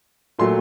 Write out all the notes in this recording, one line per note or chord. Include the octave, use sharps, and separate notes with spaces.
A#2 F#3 A3 C6